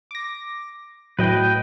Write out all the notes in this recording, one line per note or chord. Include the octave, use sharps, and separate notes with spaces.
D6 A#6
A2 F#3 B4 D#5 G5